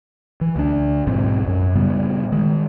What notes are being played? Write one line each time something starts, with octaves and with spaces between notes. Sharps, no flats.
E3
D2 D4
B1 G#2 F3 C4
F#2
A#2 C#3 G3 B3
D#3 G#3